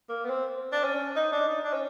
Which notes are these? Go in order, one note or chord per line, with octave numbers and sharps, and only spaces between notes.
A#3
B3
C4
D4
C#4
D#4
D4
D#4
D4
C#4